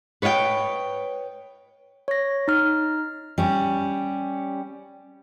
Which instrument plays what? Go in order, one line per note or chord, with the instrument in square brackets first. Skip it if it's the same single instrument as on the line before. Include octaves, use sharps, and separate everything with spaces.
[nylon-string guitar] B4 C#5 D#5 F5 G5
[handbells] C#5 A#6
D#4 F6
[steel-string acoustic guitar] G3 C#4